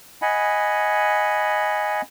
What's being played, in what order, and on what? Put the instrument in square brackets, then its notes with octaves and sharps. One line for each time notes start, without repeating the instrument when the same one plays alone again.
[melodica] D#5 F#5 G#5 B5